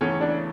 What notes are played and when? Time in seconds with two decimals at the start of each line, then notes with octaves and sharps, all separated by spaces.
0.01 E2 C#3 E3 A3 C#4
0.21 D4